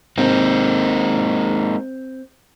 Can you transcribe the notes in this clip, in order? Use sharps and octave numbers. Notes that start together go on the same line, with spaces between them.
G#3 A#3 C4 D#4